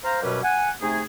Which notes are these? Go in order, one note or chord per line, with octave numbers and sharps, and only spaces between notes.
C5 F5 A#5
F#2 B2 F#3 G3 C#4 B4
F#5 G#5
C3 A3 D#4 G#4